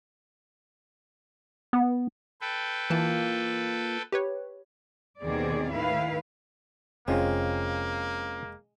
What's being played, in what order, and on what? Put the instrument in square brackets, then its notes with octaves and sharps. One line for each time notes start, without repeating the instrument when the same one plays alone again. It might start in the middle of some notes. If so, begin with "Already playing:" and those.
[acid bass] B3
[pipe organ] A4 B4 G5
[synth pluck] E3 A5 [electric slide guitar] A#3 F4
[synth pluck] G4 B4 C#5
[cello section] D#2 B2 D#3 C4 G#4 D5
A2 D#3 E4 B4 F5
[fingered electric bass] F1 [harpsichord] G#3 [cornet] A#3 [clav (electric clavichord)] C4 C#4 F4